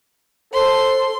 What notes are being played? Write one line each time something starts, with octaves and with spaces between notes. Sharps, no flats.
A4 C5 C6